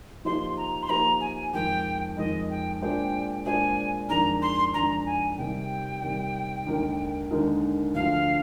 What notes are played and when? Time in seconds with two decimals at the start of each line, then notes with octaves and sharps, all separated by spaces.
0.25 F3 A#3 D#4 G4 C5 C6
0.57 A#5
0.83 C6
0.89 F3 A#3 D#4 G4 C5 A#5
1.21 G#5
1.54 F2 D#3 G#3 G5
2.17 F2 D#3 G#3 D#5
2.50 G5
2.81 A#2 G#3 D4 G#4 C5 G5
3.46 A#2 G#3 D4 G#4 C5 G#5
4.09 F2 D#3 G#3 D4 G#4 A#5
4.42 C6
4.74 F2 D#3 G#3 D4 G#4 A#5
5.06 G#5
5.38 C3 D#3 G3 G5
6.02 C3 D#3 G3
6.66 D#2 D3 G#3 D#4 A#4
7.31 D#2 D3 G#3 D#4 A#4
7.95 D2 D3 F3 F5